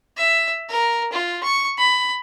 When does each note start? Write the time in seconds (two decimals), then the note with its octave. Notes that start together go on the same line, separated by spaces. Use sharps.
0.17 E5
0.69 A#4
1.13 F4
1.43 C#6
1.78 B5